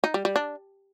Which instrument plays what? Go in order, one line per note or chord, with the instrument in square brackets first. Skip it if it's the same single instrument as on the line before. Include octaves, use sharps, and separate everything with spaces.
[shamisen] D#4
G3
G3
D4